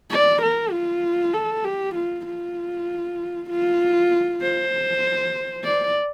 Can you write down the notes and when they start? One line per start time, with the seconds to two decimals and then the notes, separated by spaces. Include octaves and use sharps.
0.10 D5
0.42 A#4
0.72 F4
1.34 A4
1.64 G4
1.95 F4
2.26 F4
3.50 F4
4.42 C5
5.64 D5